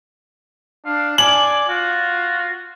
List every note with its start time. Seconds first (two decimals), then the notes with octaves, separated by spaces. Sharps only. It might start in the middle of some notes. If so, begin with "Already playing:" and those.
0.85 D4 F5
1.18 D5 G#5 F#7
1.69 F4 F#4